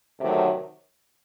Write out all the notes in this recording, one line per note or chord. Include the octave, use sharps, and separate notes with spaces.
D2 C3 D#3 F#3 A3